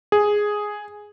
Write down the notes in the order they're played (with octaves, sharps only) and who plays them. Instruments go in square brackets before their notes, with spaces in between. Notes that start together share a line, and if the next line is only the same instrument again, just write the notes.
[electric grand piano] G#4